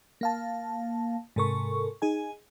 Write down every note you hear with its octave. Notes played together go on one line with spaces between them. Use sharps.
A#3 F5 A5
G#2 C3 A4 A#4 C#6
D#4 G#4 G#5